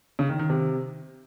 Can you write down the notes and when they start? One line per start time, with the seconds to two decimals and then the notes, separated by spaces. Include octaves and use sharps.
0.19 C#3
0.29 D#3
0.39 D#3
0.50 C3